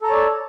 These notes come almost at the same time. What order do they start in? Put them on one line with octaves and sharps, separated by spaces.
A4 A#5 A5 C#5 D5